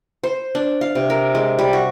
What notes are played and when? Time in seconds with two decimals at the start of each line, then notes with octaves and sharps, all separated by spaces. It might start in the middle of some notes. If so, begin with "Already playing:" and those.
0.23 C5
0.55 D4
0.81 F5
0.95 C3
1.10 A#4
1.35 G#3
1.59 G3
1.73 F#4